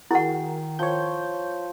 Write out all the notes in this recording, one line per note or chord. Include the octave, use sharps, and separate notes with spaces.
D#3 E4 F#4 G#4 A#4 F#5
F3 C#5 G6